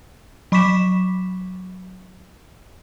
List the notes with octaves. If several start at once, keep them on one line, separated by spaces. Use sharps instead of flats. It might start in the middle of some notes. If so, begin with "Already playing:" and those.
F#3 B5 C#6 D6 B6 E7